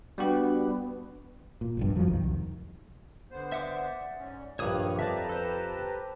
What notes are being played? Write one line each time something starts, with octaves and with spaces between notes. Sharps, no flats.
G3 B3 D4 F#4 G4
A#2
F1 A#1 G2
F2 F3 F#3
B1 F2 D#3
C2
D3 B3 C5
D5 E5 F#5 D6
G#2 C#4
A#1 G2 D#3 C#5 D6 D#6 F6 F#6
F2 G4 B4 D5 E5 A5 A#5
A4 C5